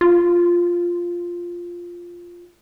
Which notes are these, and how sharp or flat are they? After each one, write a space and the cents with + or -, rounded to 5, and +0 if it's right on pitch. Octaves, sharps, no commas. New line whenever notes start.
F4 +0